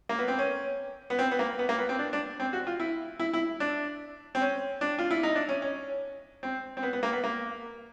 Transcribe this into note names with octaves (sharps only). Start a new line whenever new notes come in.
A#3
B3
C4
C#4
B3
C4
B3
A#3
B3
A#3
B3
C4
D4
D4
C4
F#4
F4
E4
E4
E4
D4
C4
C#4
D4
F4
E4
D#4
D4
C#4
C#4
C4
C4
B3
B3
A#3
B3
A#3